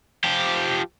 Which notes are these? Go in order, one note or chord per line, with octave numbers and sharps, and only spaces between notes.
F3 G4